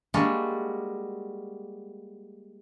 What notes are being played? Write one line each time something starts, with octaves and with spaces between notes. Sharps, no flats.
G3 G#3 A#3 D4 F#4